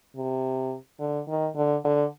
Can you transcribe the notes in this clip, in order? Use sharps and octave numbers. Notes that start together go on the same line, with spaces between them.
C3
D3
D#3
D3
D3